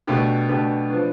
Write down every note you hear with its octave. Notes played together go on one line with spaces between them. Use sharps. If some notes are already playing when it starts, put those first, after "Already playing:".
B2 A3 D4 G4
B2 A3 D4 G4
F3 B3 D4